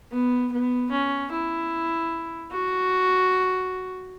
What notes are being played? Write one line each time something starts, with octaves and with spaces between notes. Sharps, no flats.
B3
B3
C#4
E4
F#4